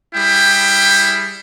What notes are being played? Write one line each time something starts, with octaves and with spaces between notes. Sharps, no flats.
G3 E4 G#4 G5